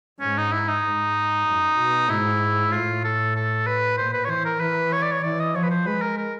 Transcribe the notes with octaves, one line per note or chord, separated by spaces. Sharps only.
G#2 C#4
D#4
E4
D#4
G#2
F#2
B2
G#2 E4
A2 F4
A4
A4
B4
A#2 C5
B4
C#5
E3 C5
A#4
E3 B4
C#5
D5
C#5
E3 D5
D#5
F3 C#5
B4
C5
G#3 B4
A#4
A#4